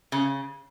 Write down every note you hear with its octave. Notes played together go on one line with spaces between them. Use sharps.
C#3